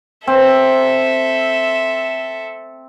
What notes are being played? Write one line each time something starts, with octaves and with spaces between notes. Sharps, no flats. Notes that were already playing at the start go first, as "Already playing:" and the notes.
C4 A4 E5